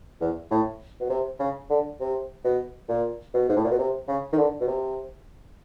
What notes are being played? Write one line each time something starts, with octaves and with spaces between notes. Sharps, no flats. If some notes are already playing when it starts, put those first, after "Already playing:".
E2
A2
B2
C3
C#3
D3
C3
B2
A#2
B2
G#2
A2
A#2
B2
C3
C#3
D#3
D3
B2
C3